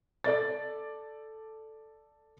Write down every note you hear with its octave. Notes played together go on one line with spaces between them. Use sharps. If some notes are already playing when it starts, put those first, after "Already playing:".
A4 D5 A6